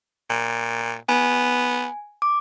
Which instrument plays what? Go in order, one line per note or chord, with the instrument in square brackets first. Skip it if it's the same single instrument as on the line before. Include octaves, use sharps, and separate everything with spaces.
[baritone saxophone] A#2
[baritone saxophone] B3 [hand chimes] G#5
[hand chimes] D6